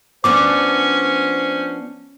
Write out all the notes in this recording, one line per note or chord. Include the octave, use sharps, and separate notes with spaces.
F3 B3 C#4 D4 C5 D6